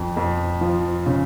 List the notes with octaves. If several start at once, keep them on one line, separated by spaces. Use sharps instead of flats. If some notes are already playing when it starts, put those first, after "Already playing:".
Already playing: F2
F2
F3
C#3